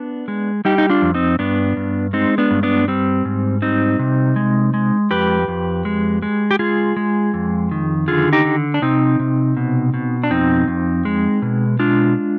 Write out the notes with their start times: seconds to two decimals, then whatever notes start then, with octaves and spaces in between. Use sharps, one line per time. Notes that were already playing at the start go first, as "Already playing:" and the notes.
Already playing: B3 D4
0.28 G#3
0.65 G3 D#4 G4
0.78 D#4
0.90 D4 F4
1.02 F2
1.14 C4 D#4
1.39 G2 B3 D4
1.77 G2
2.13 G#3 C4 D#4
2.38 B3 D4
2.51 G2
2.63 B3 D4
2.88 G3 C4
3.25 G#2
3.62 G3 C4 D#4
3.99 C3
4.36 G#3
4.74 G#3
5.11 F2 G4 B4
5.48 F2
5.85 G#3
6.22 G#3
6.51 G4
6.59 G#3 F4 G#4
6.96 G#3
7.34 F2
7.71 D#3
8.08 D3 F4 G#4
8.33 D#4 G4
8.45 D3
8.74 D4
8.82 C3 C4 D#4
9.19 C3
9.57 B2
9.94 B2
10.24 D4
10.30 F2 C4 D#4
10.68 F2
11.05 G#3
11.42 B2
11.79 G#3 D4 F4